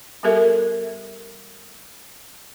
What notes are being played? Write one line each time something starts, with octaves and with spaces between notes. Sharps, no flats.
G3 B3 G4 A4 A#4 E5